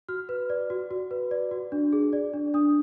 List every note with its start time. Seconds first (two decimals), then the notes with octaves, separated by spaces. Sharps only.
0.09 F#4 F6
0.29 B4
0.50 D5
0.70 F#4
0.91 F#4
1.11 B4
1.31 D5
1.51 F#4
1.72 D4
1.93 G#4
2.13 D5
2.34 D4
2.54 D4 D#6